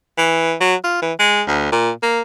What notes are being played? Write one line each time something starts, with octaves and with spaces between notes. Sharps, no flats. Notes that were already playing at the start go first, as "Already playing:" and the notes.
E3
F#3
F4
E3
G#3
D2
A#2
A#3